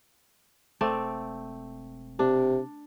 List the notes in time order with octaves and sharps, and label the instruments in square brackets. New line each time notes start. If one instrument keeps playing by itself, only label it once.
[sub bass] E1 [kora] A3 C4 D5
[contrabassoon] C3 [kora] D4